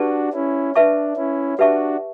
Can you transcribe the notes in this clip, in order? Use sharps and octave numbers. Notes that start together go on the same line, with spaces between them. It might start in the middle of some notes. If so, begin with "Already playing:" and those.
Already playing: D4 F#4 G4 B4 D5 A5 C#6
C#4 E4
D4 B4 E5 A5 C#6
C#4 E4
D4 F#4 G4 B4 E5 A5 C#6